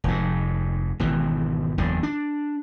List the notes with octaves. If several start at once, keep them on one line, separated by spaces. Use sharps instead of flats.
F1 G#2
G#1 B2 E3
F#1 E2 D3
D4